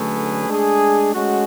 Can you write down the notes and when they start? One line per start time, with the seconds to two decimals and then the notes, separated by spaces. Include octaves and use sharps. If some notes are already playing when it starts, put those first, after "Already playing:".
Already playing: D3 F#3 A3 C#4 G#4 B4
0.48 G#3 D4 G#4
1.13 G#3 C#4 F#4